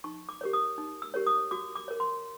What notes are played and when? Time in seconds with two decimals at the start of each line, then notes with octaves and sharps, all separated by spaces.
0.04 D#4 C#6
0.29 D6
0.41 G4 A#4 C#5
0.53 D#6
0.78 D#4
1.02 E6
1.14 G4 A#4 C#5
1.27 D#6
1.51 F#4 D6
1.76 D6
1.88 A#4 C#5
2.00 C6